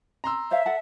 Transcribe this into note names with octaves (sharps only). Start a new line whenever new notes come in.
A#5 C6 E6
C5 C#5 E5 F5
A4 F#5 A5